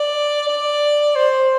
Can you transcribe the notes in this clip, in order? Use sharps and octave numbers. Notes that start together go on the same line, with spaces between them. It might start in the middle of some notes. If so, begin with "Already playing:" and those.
Already playing: D5
D5
C5